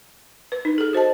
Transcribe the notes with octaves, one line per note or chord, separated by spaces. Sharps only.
B4
D#4
G#4 A4
F#4 C5 D#5 A5